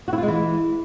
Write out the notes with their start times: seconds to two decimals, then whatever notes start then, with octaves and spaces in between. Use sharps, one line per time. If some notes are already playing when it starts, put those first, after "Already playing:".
0.08 F#4
0.13 E4
0.18 F4
0.23 G#3
0.28 E3